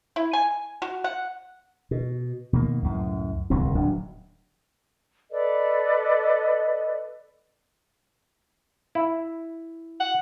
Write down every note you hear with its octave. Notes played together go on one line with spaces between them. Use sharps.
E4
G#5
F#4
F#5
B2
B2 D#3 A#3
C#2 F#2 A2
D1 C2 A#2 C4
D1 F#3 D4
A4 B4 D5 D#5
E4
F#5